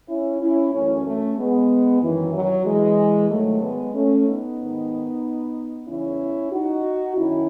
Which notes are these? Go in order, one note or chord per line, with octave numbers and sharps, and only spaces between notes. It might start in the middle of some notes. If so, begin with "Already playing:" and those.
C#4 E4
C#4 E4
F#2 E3 A3 C#4
A3 C#4
G#3 B3
F#2 D#3 E3
F#3
E3 G#3
G#2 D#3 F#3 A3
G#3 B3
A3 C#4
B3 D#4
G#2 D#3
E2 C#3 E3 C#4 E4
D#4 F#4
F#2 D#3 C#4 E4